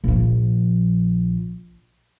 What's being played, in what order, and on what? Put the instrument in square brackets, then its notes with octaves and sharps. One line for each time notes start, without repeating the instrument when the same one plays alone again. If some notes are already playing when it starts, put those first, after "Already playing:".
[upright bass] A#1 F3